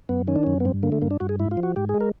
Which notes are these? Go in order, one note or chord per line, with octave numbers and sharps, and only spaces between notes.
F#2 B3
D#3 C#4
D4
F#2 C#4
B3
G2 C4
D3 A#3
A3
G2 A#3
D4
G2 F#4
G#4
G#2 E4
F4
F3
F#4
G#2 G4
G#4
G#3
A#4